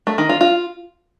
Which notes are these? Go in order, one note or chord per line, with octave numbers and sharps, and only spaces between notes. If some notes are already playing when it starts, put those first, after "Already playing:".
A3
D#3
F4
F4